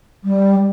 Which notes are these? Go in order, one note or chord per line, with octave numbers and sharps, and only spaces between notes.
G3